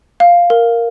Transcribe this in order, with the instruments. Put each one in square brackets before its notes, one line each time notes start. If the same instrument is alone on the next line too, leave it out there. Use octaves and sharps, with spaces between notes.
[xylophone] F5
A#4